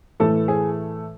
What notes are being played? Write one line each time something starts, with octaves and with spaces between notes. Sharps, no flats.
A2 E3 A3 A4
G#4